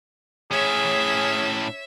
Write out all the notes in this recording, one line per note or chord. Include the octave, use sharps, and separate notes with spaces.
A2 C#4 G#4 C#5 E5